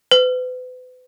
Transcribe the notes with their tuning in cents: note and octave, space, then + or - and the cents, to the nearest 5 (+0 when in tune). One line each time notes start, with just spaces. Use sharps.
B4 +40